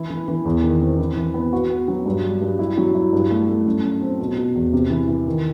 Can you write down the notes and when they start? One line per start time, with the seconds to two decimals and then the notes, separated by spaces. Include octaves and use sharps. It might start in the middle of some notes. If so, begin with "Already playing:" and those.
Already playing: E3 E4
0.10 E3
0.28 E3
0.45 E2
0.63 D#3
0.81 C4
0.99 E3
1.17 E3
1.34 B3
1.53 F#4
1.70 B3
1.88 F#3
2.06 G2
2.24 G3
2.41 G2
2.59 E4
2.77 F#3
2.95 E4
3.13 G2
3.31 A3
3.48 A3
3.66 F#2
3.83 F#2
4.02 C4
4.20 B2
4.37 B2
4.55 E2
4.73 C3
4.90 E3
5.08 E3
5.27 D#3